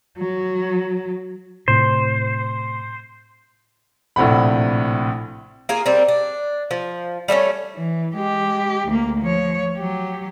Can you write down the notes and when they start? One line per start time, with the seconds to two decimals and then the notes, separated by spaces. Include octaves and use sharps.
0.17 F#3
1.68 A2 C3 C5
4.16 A#1 A2 C3 F#5 B5
5.69 A#3 F4 G#4
5.86 G3 A#3 C4
6.08 D4
6.71 F3
7.28 G3 A3 A#3 C#4
7.75 E3
8.15 G#3 G4
8.87 D2 A#3
9.21 F3 C#5
9.76 F#3 G4